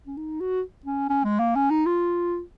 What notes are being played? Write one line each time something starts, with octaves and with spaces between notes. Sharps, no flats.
C#4
D#4
F#4
C#4
C#4
G#3
A#3
C#4
D#4
F4